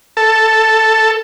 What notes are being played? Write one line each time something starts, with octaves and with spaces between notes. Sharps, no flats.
A4